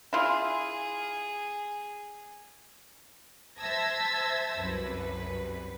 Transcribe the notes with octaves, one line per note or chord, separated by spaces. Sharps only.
E4 F4 G#4
C5 E5 A5 E6 G#6 A#6
C2 F#2 B4